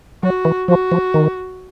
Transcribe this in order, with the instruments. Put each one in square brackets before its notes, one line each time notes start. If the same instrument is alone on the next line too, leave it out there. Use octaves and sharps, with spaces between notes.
[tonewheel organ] F#3 [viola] F#4
[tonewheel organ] E3
[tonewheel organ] F3 [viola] F#4
[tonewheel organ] F3
D#3